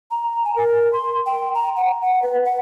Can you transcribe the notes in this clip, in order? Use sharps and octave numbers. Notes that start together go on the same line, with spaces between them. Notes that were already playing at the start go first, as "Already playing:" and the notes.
A#5
G#5
A#4
C6
G5
A#5
F#5
F#5
B4
F#5